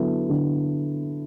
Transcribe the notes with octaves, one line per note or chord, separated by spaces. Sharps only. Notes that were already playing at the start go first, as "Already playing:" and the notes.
Already playing: D3 F#3 B3 E4 A4
D3